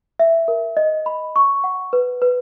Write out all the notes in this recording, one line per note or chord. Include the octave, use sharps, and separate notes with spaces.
E5
A#4
D#5
B5
C#6
F#5
B4
B4